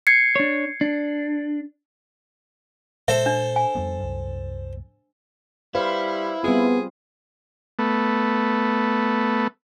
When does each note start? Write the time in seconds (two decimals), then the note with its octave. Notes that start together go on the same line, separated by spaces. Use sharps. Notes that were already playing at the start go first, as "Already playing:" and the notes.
0.07 G#6 C7 C#7
0.36 D4 C#5
0.81 D4
3.08 A#2 G#3 A4 C5 E5
3.26 D4
3.56 G#5
3.75 F2 G3 B3
4.00 C2 F#2
5.75 G3 E4 B4 C5 F5
6.44 G3 B3 C4 F4 G#4
7.79 A3 B3